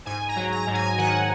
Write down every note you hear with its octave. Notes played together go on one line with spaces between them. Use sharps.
G#2 G#5
A#5
F#3
A#5
G#2
G#5
D#3 F#5